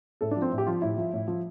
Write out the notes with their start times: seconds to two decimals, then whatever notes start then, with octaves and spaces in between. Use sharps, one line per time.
0.21 A2 A4
0.31 D4
0.37 F3
0.42 C4
0.52 A2
0.58 G4
0.67 F3 F4
0.82 A2 E4
0.98 F3
1.13 A2
1.28 F3